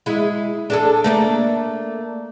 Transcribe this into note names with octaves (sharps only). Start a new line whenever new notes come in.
G#3 E4
D4 G#4 A4
A3 A#3 D4